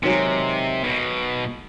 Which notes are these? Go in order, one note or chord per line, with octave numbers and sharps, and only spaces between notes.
C3 D#3 F#3 G#3
B1 B2